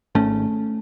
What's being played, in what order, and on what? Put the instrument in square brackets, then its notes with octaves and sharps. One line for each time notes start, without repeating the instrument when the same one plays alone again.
[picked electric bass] G#1 A3 C#4